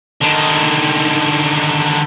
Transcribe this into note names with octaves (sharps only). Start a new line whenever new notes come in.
D3 D#3